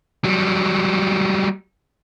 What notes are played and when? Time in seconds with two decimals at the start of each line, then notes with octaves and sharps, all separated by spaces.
0.24 F#3 G3